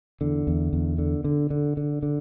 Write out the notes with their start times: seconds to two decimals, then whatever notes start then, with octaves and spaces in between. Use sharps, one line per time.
0.21 E2 D3
0.47 E2
0.73 E2
0.98 D3
1.24 D3
1.50 D3
1.77 D3
2.03 D3